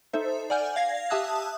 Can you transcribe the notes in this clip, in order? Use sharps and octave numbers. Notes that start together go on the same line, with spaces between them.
D#4 A4 C5 E5
D5 F#5 G#5 F6 G6
F5 G#6 A#6 C7
G4 E5 A5 D#6 E6 F#6